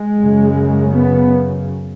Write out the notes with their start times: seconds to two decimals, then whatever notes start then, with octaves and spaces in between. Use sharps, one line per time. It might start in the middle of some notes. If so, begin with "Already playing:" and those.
Already playing: G#3
0.18 F#2 C#3
0.93 B3